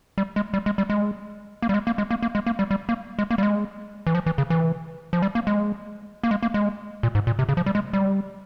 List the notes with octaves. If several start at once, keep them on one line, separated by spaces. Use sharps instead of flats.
G3
G#3
G3
G#3
G3
G#3
A#3
G3
G#3
A#3
G#3
A#3
A#3
G#3
A#3
G3
G3
A#3
G#3
A#3
G3
G#3
E3
F3
E3
C#3
E3
F3
G3
A#3
G#3
A#3
G#3
A#3
G#3
A#2
G#2
A#2
C3
C#3
F3
G3
G#3
G3